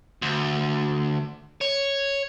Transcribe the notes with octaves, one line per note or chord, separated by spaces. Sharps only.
D2
C#5